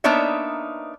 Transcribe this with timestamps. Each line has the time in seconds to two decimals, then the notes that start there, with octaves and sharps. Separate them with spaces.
0.04 A#3 B3 D4 D#4 C#5 E5